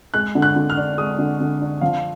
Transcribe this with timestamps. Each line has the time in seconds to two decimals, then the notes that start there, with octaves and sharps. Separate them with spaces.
0.14 G#3 F#6
0.35 D3
0.42 F#6
0.56 D3
0.70 F6
0.77 D4
0.98 G#3 D#6
1.19 D3
1.40 D3
1.61 D4
1.81 F3 F5